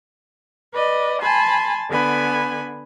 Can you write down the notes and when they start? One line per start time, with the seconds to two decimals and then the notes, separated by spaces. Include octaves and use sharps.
0.72 B4 D5 D#5
1.21 G#5 A5 B5 C6
1.88 D3 B3 G#5 B5